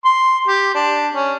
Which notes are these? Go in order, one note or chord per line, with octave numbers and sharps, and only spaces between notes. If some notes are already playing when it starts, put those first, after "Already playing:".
C6
G4
D4
C#4